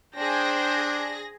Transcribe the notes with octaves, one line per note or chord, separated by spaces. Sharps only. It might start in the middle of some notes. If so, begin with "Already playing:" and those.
D4 G#4 C5 G5 A#6